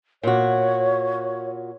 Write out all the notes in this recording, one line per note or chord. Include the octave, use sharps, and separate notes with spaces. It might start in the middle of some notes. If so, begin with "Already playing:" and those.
A#2 F#4 C#5